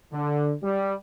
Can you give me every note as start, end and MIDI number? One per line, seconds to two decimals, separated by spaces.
0.12 0.53 50
0.62 0.94 55